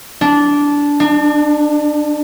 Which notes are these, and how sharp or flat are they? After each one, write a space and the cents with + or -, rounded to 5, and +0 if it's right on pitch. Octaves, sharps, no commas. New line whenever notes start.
D4 -15
D4 +35